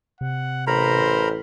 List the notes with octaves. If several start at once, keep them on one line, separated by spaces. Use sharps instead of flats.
C3 F#5
A1 A#4 C5 A#5 B5